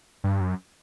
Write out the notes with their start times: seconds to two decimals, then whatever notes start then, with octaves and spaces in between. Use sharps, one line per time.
0.24 G2
0.41 F#2